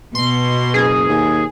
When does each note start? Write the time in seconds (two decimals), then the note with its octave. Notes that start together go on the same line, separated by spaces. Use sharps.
0.15 B2 C6
0.74 F#1 G#4
1.09 D#2